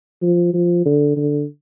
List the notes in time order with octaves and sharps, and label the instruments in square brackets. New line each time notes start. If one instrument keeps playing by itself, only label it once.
[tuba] F3
F3
D3
D3